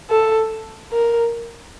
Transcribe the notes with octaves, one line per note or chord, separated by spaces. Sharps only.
A4
A#4